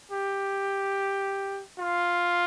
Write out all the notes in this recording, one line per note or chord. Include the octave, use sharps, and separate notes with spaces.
G4
F4